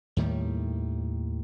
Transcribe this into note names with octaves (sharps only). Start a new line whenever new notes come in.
D#2 A2 D#3 G3